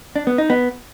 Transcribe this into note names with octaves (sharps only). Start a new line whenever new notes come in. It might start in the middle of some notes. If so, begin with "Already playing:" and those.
D4
B3
D#4
B3